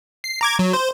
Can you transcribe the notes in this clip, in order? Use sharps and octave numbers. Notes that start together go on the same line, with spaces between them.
C7
A#5 D6 G#6
F#3
C5